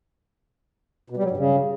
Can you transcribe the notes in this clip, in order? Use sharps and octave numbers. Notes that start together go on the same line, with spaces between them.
B2
G3
F#3
G2
C#3